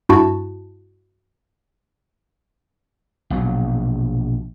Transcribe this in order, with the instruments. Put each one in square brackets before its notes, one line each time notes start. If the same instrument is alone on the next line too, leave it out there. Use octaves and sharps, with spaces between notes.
[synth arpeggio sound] G2 E4 F#4 A5
[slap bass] A#1 B2 F#3